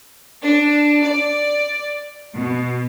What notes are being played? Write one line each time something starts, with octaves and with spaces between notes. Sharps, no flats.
D4
D5
B2